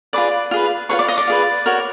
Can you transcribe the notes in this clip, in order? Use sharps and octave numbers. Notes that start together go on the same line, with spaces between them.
F4 G#4 B4 D5 D6
F4 G#4 B4
F4 G#4 B4 C#5 C#6
D5 D6
D#5 D#6
D5 D6
F4 G#4 B4
F#4 A#4 C#5